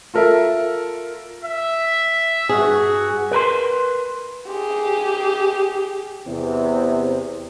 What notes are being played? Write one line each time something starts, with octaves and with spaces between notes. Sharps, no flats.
F4 A4 A#4 E5
E5
G2 F#4 G#4
A#4 B4 A#5 C6
G4 G#4
E2 C3